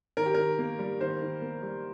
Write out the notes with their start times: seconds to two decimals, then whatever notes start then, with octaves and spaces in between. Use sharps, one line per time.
0.17 D#3 A#4
0.26 G4
0.34 D#3 A#4
0.59 A#3
0.79 G3
1.00 D#3 C5
1.22 D#3
1.42 A#3
1.63 G3